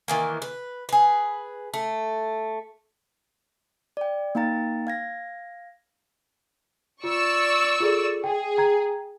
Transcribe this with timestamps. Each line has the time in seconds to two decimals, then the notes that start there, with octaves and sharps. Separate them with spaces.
0.08 D#3 E3 A#3
0.42 B4
0.89 G#4 B4
1.74 A3
3.97 D5 G5
4.35 A#3 D#4 F5 G5 A#5 A6
4.87 F5 G#6 A#6
7.04 F4 D5 C#6 E6
7.80 F4 G#4 A4
8.24 G#4 G5
8.57 G5 A#5 G#6